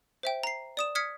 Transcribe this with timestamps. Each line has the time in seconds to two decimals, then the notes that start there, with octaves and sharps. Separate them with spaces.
0.23 C5 E5 G5
0.43 A#5 C7
0.77 D5 D#6 E7
0.95 D#6 F6 G#6 B6 C#7